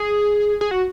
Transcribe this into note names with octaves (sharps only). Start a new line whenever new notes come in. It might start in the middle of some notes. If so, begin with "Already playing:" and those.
Already playing: G#4
G#4
F#4